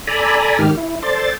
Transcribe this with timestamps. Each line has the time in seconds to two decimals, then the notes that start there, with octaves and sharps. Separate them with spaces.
0.07 A4 D5 G#5 A#5 B5
0.59 G#2 D#3 G4 F6
0.77 E4
1.02 A4 C5 D5 C6 A6